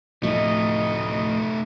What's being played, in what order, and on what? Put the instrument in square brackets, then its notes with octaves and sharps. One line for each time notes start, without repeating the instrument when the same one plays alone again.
[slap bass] D2 A2 F3 [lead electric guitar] A3 D#4 [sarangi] D#5